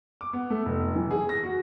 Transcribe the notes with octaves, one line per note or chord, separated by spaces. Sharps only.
D6
B3
A3
F1
E3
G#4
A#6
F#4